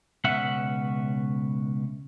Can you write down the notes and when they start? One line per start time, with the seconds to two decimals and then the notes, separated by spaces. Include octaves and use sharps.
0.24 C#2 B2 C#4 B4 E5 F#5